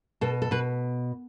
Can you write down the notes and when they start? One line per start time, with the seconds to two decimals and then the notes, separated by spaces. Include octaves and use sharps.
0.21 B2 A4
0.42 A4
0.51 B2 B4